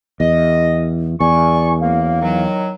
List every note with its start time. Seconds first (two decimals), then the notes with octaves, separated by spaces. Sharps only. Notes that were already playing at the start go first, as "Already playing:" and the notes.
0.20 E2 D#5
1.20 E2 D5 G#5 C#6
1.81 F#2 A#3 F5
2.21 D#3 F#3